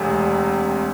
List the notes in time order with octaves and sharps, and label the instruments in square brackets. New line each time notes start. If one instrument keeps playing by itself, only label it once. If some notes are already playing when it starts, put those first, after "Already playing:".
Already playing: [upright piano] E1 D2 C3